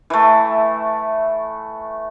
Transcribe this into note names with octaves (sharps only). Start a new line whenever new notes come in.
E3 A3